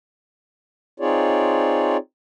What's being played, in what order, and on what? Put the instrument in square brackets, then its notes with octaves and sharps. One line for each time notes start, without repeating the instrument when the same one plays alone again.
[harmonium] C4 D#4 F4 G#4 C#5 D5